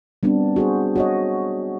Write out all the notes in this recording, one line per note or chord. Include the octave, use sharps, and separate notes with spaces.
G3 B3 C4 D4
F#4 G#4 C5
F#4 C#5 D#5